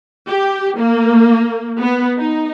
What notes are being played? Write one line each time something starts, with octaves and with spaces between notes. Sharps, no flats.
G4
A#3
B3
D#4